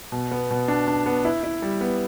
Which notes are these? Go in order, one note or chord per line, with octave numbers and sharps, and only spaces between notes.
B2
B3
B2
D4
D4
B3
E4
E4
G3
B3